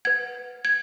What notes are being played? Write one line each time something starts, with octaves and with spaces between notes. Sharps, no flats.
B4 F#5 G#6
G#6